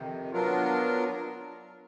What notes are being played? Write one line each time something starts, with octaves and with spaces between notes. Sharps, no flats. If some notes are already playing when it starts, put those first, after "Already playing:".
Already playing: F2 C3 D#3
F#3 B3 D4 F4 A#4